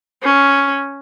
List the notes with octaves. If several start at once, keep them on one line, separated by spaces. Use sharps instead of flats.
C#4